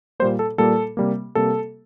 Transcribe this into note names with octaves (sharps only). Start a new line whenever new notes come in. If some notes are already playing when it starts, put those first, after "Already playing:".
A#2 G3 A#3 C5
A4
A#2 G3 A#3 A4
C3 G3 A#3
C3 G3 A#3 A4